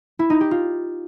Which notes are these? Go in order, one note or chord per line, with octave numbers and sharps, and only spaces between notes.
E4
D#4
G4
F4